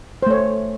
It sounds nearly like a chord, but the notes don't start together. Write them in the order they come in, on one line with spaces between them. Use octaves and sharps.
C5 A3 C#5